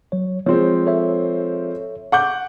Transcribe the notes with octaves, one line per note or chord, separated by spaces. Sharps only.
F#3 C#5
F3 G#3 C4 C#5
A4 C#5 E5
F#5 D6 G6